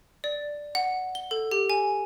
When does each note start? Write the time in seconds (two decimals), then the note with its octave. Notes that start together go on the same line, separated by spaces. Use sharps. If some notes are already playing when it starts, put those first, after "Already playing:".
0.24 D5
0.75 F#5
1.15 G7
1.31 A4
1.51 G4
1.70 G#5